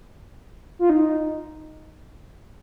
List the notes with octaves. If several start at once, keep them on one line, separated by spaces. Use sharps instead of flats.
F4
D#4